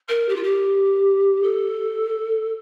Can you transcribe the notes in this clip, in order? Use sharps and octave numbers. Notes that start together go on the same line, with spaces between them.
A#4
G4
F4
G4
A4